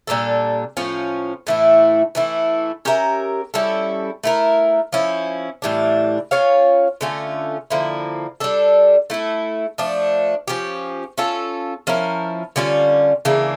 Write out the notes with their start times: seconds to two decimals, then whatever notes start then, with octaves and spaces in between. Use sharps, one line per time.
0.07 A#2 G3 D4 A4
0.77 A2 F3 C#4 F4
1.47 A2 E3 A3 E4
2.15 E3 A3 E4
2.85 C#4 G4 A#4 E5
3.54 G3 C#4 E4 A4
4.23 A3 E4 A#4
4.93 F3 C#4 E4
5.62 A2 E3 G3 D4
6.31 C#4 F4 C#5 F5
7.01 D3 A3 C#4 F4
7.70 D3 F3 A#3 E4
8.40 G3 D4 A4
9.10 A3 E4 A4
9.78 F3 A3 D4
10.48 F3 C#4 G4
11.18 C#4 F4 A4
11.87 F3 C#4 E4 A#4
12.56 D3 G3 C#4 F4
13.25 C#3 E3 A#3 D4